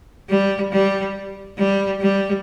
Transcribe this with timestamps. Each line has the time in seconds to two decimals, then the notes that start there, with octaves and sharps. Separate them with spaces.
0.29 G3
0.72 G3
1.58 G3
2.00 G3